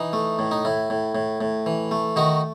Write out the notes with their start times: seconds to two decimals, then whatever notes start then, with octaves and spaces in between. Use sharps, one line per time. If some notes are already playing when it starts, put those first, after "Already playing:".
Already playing: E3 D#4
0.13 A3
0.39 A2
0.51 D#4
0.65 A2 E4
0.90 A2
1.15 A2
1.41 A2
1.66 E3
1.91 A3
2.16 D#3 D#4 F#4